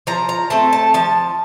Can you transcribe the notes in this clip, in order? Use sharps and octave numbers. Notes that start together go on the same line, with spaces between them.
F3 A#5
A#5
A3 C4 A5
A5
F3 A5